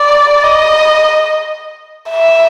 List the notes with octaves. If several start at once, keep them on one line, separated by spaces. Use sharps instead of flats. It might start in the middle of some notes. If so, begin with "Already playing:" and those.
Already playing: D5
D#5
E5